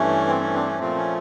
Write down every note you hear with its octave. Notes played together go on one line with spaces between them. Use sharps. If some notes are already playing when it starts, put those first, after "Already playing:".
Already playing: G2 E3 A3 C#4
C4
C#4
C4 D4
C#4
A#2 F3 A3 C4
C#4